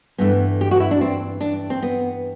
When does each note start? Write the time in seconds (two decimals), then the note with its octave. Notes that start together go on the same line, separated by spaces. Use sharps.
0.18 G2 E3 A3 B3
0.61 G4
0.71 F#4
0.80 E4
0.91 D4
1.01 C4
1.41 D4
1.70 C4
1.83 B3